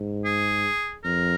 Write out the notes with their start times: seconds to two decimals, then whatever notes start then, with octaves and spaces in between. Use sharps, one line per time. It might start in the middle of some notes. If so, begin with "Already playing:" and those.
Already playing: G#2
0.25 G#4
1.04 F2 A#4